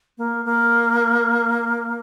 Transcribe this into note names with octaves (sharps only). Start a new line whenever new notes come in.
A#3
A#3